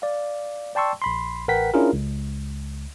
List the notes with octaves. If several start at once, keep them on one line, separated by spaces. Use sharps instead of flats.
D5 F5
D5 G5 A5 C6 C#6 E6
A#1 B5 C6
A1 A#4 B4 F#5 G5 B6
C#4 D4 E4 F4 G#4 A#4
C#2